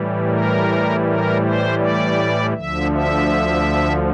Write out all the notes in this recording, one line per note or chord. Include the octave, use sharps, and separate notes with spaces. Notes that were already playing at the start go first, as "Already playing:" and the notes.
Already playing: A2 E3 G3
A#4
A#4
C5
D5
D2 D3 F3 E5
E5